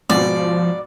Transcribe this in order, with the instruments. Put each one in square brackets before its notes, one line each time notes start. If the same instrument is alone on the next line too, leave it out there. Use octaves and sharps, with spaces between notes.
[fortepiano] G#2 B2 [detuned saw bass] F3 [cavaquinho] D5